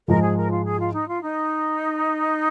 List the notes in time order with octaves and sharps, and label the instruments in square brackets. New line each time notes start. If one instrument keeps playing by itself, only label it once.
[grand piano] G#2 F3 G#3 [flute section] A#4
[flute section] G#4
A#4
F4
G#4
F4
D#4
F4
D#4